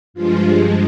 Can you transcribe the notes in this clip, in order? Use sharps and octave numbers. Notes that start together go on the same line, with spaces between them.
G2 F3 G#3 F4